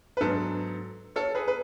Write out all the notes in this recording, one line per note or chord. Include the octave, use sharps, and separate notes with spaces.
B4
G#2 F#3 B3 D4 A4
A4 C#5
G#4 B4
B4